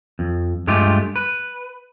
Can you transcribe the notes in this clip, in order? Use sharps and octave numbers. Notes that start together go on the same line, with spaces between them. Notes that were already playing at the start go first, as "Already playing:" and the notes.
F2
G2 G#3 A3 F4 G4
B4